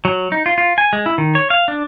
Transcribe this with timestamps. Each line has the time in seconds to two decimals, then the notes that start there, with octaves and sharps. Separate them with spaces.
0.05 F#3
0.32 D#4
0.46 F4
0.58 F4
0.78 G#5
0.93 G#3
1.06 E4
1.18 D#3
1.35 C#5
1.50 F5
1.68 D4